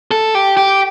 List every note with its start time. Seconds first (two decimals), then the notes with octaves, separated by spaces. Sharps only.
0.11 A4
0.35 G4
0.57 G4